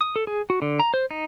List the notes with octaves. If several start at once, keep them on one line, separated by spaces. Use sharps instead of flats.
D#6
A4
G#4
F#4
D3
A#5
C5
D#4